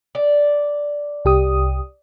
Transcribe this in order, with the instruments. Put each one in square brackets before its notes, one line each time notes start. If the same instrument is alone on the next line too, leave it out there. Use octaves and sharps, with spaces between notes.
[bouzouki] D5
[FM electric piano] C2 G4 D#6